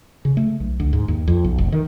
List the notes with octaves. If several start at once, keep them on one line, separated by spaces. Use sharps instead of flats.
C#3
A3
B1
D2
G#2
D#2
F2
B1
F1
D#3